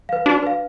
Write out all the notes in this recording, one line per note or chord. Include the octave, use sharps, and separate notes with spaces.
B4 F5
D4 F#4
B4 F5